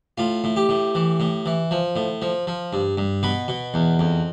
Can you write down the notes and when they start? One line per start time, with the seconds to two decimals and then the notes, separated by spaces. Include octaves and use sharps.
0.18 A2 F4
0.44 A2
0.56 G4
0.69 A2
0.95 E3
1.20 A2
1.46 E3
1.71 F3
1.96 A2
2.22 F3
2.47 F3
2.73 G2
2.97 G2
3.23 B2 B4
3.48 B2
3.74 E2
3.99 F2